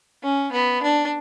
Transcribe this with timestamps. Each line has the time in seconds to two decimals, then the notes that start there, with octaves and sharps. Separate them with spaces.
0.23 C#4
0.52 B3
0.82 D4